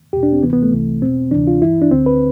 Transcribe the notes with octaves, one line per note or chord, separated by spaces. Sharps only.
E2 B2 G4
D4
C4
D2 C3 E3 B3
B3
A3
C2 C3 E3
E2 B2 C4
D2 C3 E3 D4
F4
G2 E3 E4
D4
D2 D3 C4
B4